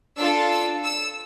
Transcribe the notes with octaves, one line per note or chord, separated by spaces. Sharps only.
D4 F4 A4 E6
E6
E6